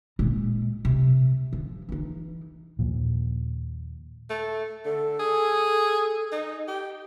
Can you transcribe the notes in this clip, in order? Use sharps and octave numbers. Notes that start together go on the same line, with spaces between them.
A#2 G#3
C3
F3
E3 D#4
D#2 A#2 F3
A3
D3 A4
G#4
D#4
G4